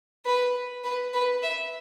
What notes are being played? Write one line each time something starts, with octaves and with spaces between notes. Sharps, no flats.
B4
B4
B4
E5